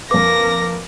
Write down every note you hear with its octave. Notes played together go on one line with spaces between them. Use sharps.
F2 A#3 A#4 B4 D6 A#6